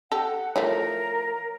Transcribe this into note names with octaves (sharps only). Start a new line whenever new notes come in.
G4 A4 F#5
E3 F3 A3 A#4 C#5